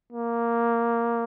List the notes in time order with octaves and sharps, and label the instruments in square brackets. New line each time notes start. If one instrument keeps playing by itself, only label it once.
[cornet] A#3